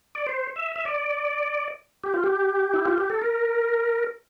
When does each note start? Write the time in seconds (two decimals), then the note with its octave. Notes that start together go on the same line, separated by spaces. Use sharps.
0.15 D5
0.26 C5
0.56 E5
0.76 E5
0.85 D5
2.04 G4
2.14 F4
2.24 G4
2.74 E4
2.86 F4
2.98 G4
3.10 A4
3.22 A#4